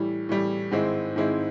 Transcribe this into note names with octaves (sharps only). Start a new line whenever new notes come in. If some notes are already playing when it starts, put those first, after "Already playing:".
Already playing: A2 E3 G3
A2 E3 G3
G#2 D#3 G#3 C4 E4
G#2 D#3 G#3 C4 E4